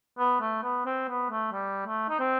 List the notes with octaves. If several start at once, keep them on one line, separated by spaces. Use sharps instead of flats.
B3
A3
B3
C4
B3
A3
G3
A3
D#4
C4